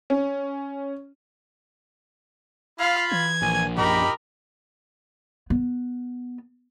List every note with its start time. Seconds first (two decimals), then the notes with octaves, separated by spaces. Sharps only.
0.10 C#4
2.80 F4 F5 B5
3.12 E3 G#6
3.42 A#1 G#5
3.78 F#2 D#4 G4 A#4 B5
5.50 B3